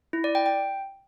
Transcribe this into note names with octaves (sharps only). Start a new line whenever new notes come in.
E4
D5
G5
G5